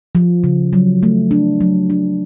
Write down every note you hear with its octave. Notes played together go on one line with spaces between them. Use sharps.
F3
C#3
F#3
A3
D4
F#3
D4